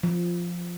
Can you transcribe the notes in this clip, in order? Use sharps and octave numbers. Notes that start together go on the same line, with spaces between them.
F3